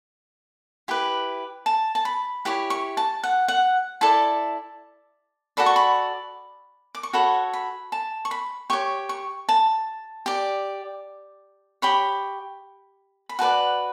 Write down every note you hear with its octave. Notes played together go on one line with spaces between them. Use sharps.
E4 G4 B4
A5
A5
B5
E4 G4 C#5
C#6
A5
F#5
F#5
E4 A4 D5 A5
F#4 A4 D5 B5
C#6
B5
D6
C#6
F#4 A4 C#5 B5
B5
A5
C#6
B5
G4 C#5 C#6
C#6
A5
G4 D5
G4 C#5 B5
B5
F#4 B4 D5 A5